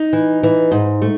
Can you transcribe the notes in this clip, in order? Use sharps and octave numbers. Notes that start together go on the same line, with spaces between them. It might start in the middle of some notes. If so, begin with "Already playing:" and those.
Already playing: D#4
E3
E3
G#2
A3